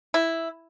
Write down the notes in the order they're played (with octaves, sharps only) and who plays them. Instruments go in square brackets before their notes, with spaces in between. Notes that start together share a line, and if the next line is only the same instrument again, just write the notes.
[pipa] E4